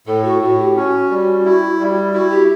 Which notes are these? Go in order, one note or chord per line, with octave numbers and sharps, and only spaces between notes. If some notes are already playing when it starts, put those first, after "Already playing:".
A2 A4
F#4
A2 F#4
G4
C#4 F#4
G3
E4
G3
E4 F#4
G4